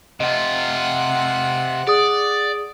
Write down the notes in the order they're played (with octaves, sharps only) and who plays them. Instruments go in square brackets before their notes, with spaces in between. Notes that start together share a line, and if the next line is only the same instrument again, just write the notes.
[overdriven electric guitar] C3 F4 [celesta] D#5 [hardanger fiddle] F#5
[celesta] G#4 D#6 [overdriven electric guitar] D5